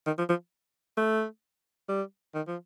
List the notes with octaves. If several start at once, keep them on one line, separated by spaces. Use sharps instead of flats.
D#3
F3
F3
A3
G3
D#3
F3